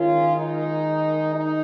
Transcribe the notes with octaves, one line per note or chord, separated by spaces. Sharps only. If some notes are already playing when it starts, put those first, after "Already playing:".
Already playing: D#3 G#3 C#4 F4
D#4
D#4